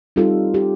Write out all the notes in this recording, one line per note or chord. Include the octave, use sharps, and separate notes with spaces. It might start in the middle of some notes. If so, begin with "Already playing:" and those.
G3 C4 D#4 F4 A4
G4